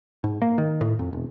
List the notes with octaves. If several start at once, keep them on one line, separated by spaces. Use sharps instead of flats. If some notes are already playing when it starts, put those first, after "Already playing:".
G#2
A#3
D#3
A2
F2
E1